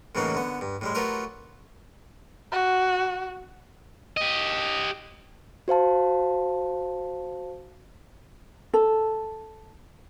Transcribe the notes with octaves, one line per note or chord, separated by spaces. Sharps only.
A2 C#3 E3 F#3 A#3 D#4
D3 B3
G2
A2 G3 G#3
F#3 A3 F4 G4 A#4 B4
F#4
G4 D#5
F#4 C5 F5 A5
A4